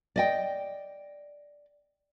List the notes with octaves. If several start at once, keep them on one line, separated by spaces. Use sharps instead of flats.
D5 D#5 G5